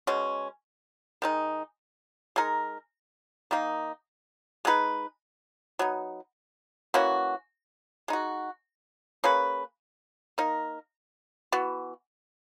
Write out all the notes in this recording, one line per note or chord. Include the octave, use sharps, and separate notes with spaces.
B2 G#3 C#4
D#3 G#3 D#4
G#3 D#4 A#4
D#3 A#3 D#4
G#3 D#4 G#4 B4
F#3 B3 D#4
E3 A#3 C#4 F#4
G#3 D#4 F#4
A#3 C#4 G#4 B4
A#3 D#4 A#4
E3 B3 F#4